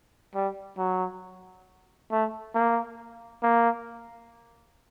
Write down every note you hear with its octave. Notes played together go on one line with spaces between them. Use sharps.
G3
F#3
A3
A#3
A#3